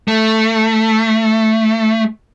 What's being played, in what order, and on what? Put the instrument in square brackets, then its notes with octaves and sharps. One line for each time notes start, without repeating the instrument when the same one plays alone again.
[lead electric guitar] A3